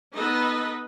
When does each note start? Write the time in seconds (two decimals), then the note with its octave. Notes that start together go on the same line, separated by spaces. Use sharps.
0.16 B3 D#4 A4 B4 D#5